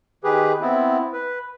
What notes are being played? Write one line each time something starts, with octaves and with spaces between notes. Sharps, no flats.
D#3 G4 G#4 B4
B3 C4 E4
B4